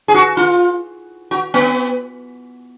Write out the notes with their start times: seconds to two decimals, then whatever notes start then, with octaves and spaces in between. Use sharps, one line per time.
0.08 G#4
0.14 F#4
0.37 F4
1.31 F#4
1.54 B3